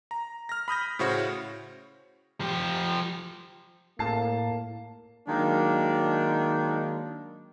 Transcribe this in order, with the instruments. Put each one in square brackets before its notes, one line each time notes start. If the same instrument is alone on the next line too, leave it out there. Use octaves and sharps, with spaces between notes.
[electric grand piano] A#5
F6 A#6
B5 D#6 G6 A#6
A2 C#3 E4 F#4 C5 C#5
[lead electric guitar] F3 G4
[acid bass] A2 [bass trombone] A#3 [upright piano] A5 C7
[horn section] D#3 F#3 G#3 A#3 D4